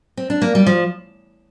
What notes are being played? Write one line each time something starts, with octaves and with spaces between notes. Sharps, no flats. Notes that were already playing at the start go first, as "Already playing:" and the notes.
C4
D4
A#3
G3
F3